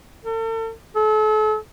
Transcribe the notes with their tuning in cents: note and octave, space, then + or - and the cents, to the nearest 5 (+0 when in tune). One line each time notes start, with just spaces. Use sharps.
A4 +40
A4 -40